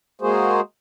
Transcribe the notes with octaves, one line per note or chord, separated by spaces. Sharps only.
G#3 A#3 F#4 G#4 C5